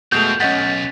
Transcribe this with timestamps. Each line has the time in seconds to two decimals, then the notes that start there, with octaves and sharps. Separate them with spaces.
0.12 B2 G#3 A3 C4 F4 G6
0.40 B1 C#4 D#5 F#5 A6 B6